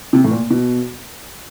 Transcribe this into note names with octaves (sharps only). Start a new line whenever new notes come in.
C3
A2
A#2
B2